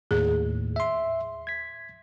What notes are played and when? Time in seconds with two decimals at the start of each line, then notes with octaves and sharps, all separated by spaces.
0.11 D#2 A2 G#4
0.76 E5 C6
1.47 G#6 B6